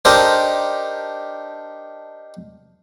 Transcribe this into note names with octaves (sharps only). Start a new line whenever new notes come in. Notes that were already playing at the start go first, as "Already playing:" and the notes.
D4 D#4 G4 A4 A#4 C5